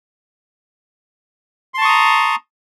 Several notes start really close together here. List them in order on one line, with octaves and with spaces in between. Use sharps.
C6 A5 C#6 D#6 A#5